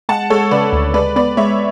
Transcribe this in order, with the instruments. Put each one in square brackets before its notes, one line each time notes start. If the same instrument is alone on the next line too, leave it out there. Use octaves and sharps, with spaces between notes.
[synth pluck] G#3 [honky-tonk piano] F#5 A5
[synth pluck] G#3 [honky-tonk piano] A4 C#5
[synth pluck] C#3 [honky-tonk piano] B4 D5
[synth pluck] D2
[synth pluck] G#3 [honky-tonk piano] B4 D5
[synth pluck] B3 [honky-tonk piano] B4 D5
[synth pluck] G#3 [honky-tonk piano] C#5 E5